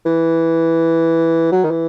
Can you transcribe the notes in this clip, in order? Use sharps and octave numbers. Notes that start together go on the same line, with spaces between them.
E3
F#3
D#3
E3